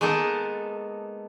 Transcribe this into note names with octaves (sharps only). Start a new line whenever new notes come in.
G#3 A#3 B3 D#4 A4